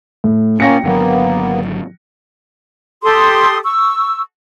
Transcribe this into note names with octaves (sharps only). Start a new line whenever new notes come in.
A2
A#2 A#3 C#4 G5 A#6 C#7
G#1 D3 F#3 A#3 B3
G4 A4 C6 D#6
C#6 E6